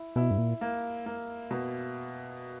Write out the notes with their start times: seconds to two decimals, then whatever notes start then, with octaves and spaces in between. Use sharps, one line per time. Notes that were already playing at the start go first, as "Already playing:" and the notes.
Already playing: E4
0.16 B2 E4
0.31 G2
0.38 A#2
0.61 A#3
1.06 A#3
1.51 B2